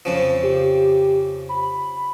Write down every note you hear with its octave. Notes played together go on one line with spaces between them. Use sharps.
F2 C#3 F3
G4
B5